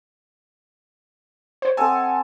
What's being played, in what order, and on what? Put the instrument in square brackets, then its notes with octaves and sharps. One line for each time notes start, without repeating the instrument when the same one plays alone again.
[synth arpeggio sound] C5 C#5
[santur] C4 A4 D#5 [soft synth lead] F#5 [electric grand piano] G#5 A5 E6